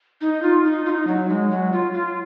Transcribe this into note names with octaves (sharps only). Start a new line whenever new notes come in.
D#4
F4
D#4
F4
D#4
F#3
G#3
F#3
F4
F4